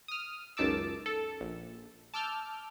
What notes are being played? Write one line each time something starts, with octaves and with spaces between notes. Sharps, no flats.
D#6 F6
C#2 F#2 D#3 A5 D6 E6
A4
A#1
A5 D6 E6 F6 G6